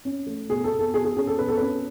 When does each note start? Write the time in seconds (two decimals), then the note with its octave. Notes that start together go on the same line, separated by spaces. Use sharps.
0.05 C#4
0.27 A3
0.49 B2 G#4
0.64 A4
0.72 B2
0.79 A4
0.94 B2 G#4
1.05 G#4
1.17 C#4 G#4
1.27 A4
1.39 B2 B4
1.49 A4
1.57 C#4 B4